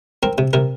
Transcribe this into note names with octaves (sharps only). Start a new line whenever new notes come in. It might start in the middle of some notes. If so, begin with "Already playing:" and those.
C4 A#4
C3
C3 A#4